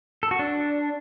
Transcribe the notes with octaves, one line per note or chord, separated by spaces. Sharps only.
A4
F#4
D4